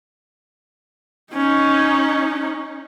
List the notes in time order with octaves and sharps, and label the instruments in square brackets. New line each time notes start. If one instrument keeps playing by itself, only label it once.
[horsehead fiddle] C#4 D#4